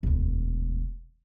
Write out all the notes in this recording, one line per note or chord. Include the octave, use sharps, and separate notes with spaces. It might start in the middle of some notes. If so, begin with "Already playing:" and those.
E1 D2